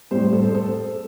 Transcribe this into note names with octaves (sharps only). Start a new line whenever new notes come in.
A2 G3 C5
A4
C5
A4